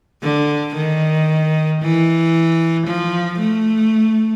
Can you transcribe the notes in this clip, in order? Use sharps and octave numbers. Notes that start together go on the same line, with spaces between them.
D3
D#3
E3
F3
A3